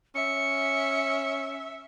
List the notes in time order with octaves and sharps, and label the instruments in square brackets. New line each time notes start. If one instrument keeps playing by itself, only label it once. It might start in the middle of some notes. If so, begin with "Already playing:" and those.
[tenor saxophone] C#4 [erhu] E5 [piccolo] C#7